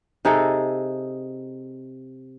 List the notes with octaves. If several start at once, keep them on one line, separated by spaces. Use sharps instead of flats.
C3 D#4 G#4 A4